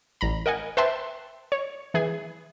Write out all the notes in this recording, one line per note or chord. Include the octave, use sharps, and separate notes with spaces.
A1 A#5 B5
A#4 D#5 F#5 G#5
B4 C5 E5 G5 A5 C6
C#5
E3 G#4 G#5